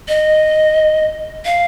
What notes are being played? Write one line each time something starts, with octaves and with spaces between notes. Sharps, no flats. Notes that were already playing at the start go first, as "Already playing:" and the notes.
D#5
F5